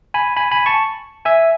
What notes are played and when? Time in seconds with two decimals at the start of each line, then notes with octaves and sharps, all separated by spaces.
0.14 G#5 B5
0.37 G#5 B5
0.51 G#5 B5
0.66 A5 C#6
1.25 E5 G#5